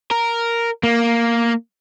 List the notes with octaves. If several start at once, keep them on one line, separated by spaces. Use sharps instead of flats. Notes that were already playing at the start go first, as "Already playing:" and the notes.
A#4
A#3